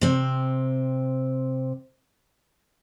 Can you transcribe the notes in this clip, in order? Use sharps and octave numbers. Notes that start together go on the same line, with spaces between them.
C3 C4